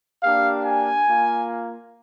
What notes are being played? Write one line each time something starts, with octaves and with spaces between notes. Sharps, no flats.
A#3 D4 G4 F5
G#5
A#3 F4